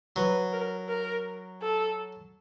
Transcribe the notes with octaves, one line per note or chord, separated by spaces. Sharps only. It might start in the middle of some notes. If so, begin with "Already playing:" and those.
F#3 B4
A#4
A#4
A4